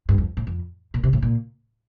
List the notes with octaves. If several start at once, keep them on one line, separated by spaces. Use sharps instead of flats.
G2
F2
A2
F2
A#2
C3
A2
A#2